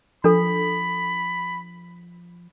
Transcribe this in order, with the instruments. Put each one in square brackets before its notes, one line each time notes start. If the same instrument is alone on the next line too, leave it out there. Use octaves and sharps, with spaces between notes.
[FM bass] F3 [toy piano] D4 A4 [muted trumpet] B5